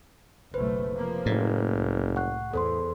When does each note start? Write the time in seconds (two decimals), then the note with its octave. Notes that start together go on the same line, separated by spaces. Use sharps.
0.54 F#1 B1 A3 B4 C5
0.94 C3 F3 A#3
1.26 F#1 A2
1.71 C2
2.16 F#5 C#6 F#6
2.54 E2 A4 C5 C6